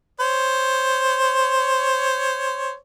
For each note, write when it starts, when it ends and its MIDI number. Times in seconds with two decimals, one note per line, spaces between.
0.20 2.75 72
0.20 2.75 73